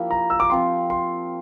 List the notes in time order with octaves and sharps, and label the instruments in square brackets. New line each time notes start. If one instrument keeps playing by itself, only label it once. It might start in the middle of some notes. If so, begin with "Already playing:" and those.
Already playing: [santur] F3 A#3 D4 E4 G4
[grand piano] A#5
E6
D6
[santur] F3 C4 F4 [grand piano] C6
[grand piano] C6